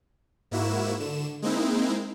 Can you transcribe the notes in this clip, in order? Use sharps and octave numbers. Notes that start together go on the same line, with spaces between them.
G#2 A#3 E4 F#4 E7
D3 E7
G#3 A#3 C4 D#4 E4